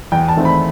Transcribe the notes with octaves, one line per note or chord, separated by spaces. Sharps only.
E2 G5
A5
D#3 A3 C4
B5